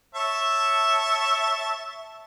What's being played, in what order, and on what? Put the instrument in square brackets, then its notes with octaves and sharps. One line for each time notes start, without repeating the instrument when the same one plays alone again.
[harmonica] C#5 E5 A5